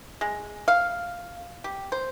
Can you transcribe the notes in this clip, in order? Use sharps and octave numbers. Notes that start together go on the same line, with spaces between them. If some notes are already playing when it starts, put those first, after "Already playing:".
G#3
F5
G4
C5